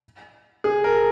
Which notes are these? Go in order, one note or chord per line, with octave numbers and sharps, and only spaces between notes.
G#4
A#4